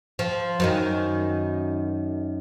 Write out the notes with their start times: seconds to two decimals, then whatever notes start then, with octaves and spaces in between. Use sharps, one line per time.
0.19 F3
0.60 F#2 D#3 D#4